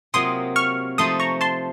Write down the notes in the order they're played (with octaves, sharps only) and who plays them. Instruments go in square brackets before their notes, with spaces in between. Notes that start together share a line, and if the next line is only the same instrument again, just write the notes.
[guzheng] C3 F#3 A#3 F4 [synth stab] C6 D#6
[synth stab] C#6 F6
[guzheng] F3 A3 D#4 [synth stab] C6 D#6
[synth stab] A#5 C#6
A5 C6